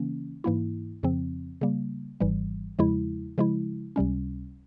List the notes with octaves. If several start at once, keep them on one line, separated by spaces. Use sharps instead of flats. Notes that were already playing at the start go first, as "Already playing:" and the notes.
Already playing: C#3 E3 A#3 C#4
G#2 E3 A#3 E4
F2 C#3 F3 C4
C#3 G3 A#3
G#1 G#2 E3 G3
E2 C#3 F3 G#3 E4
C#3 F3 G#3 E4
C#2 C3 G3 C#4